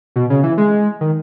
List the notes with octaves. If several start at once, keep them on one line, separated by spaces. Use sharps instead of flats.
B2
C#3
E3
G#3
D#3